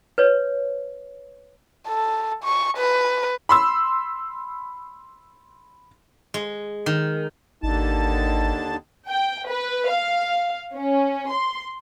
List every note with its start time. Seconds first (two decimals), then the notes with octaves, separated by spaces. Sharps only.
0.18 B4 C#5
1.88 A4
2.44 C#6
2.77 B4
3.49 B5 C6 E6
6.34 G#3
6.86 D#3
7.63 G#1 D#2 D3 D#4 A5
9.08 G5
9.48 B4
9.90 F5
10.74 C#4
11.30 C6